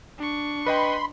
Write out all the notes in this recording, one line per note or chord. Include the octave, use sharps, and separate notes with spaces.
D4 C#6
B4 D#5 G5 B5 C6